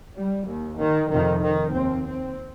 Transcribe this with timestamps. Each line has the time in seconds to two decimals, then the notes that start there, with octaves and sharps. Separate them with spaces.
0.15 G3
0.46 D#2
0.78 D#3
1.10 F2 C3 D#3
1.42 D#3
1.73 D#2 C4
2.06 C4